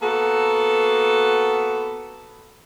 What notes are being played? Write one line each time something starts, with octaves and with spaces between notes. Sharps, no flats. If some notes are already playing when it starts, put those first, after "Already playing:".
A#3 B3 F#4 A4